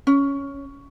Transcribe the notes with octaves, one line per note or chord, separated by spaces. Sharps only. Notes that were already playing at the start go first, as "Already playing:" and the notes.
C#4